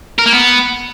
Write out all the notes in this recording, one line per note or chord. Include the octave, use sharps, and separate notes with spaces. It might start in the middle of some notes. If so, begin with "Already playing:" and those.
A#4
A#3
B3